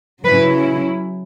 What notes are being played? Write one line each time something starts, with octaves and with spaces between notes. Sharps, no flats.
C#3 F#3 C#4 E4 B4